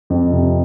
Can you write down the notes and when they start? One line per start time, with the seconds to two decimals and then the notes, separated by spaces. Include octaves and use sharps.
0.10 F2
0.31 C3